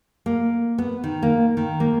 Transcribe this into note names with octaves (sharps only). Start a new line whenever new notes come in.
A#3
B3
D#3
A#3
D#3
A#3